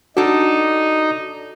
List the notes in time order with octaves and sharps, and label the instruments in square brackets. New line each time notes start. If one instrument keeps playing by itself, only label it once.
[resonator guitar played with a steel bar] D4 A4 [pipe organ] D#4 [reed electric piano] F#4